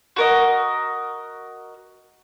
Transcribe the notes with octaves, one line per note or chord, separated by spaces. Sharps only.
F#4 A#4 D#5